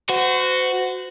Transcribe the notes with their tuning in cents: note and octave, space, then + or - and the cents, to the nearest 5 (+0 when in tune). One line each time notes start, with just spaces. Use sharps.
F#4 +0 C5 -35